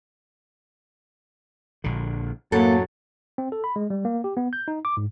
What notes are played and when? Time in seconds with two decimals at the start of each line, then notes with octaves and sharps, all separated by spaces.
1.84 A#1 D3
2.52 F#2 A2 F#3 A#3 A4
3.38 C4
3.52 A4
3.64 B5
3.76 G#3
3.90 G3
4.05 A#3
4.24 G4
4.37 B3
4.53 G6
4.68 D#4
4.85 D6
4.97 G#2